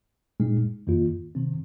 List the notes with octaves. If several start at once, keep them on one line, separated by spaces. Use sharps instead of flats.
A#2 G#3 D#4
F2 D#3 A#3 F4
C3 D#3 C4